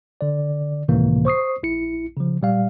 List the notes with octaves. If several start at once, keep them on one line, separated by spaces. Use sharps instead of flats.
D3 D5
C#2 A2 C3 D#3 E3 A#3
C5 C#6 D#6 C7
A#1 E4 C#7
C#3 F3
A#2 G3 F5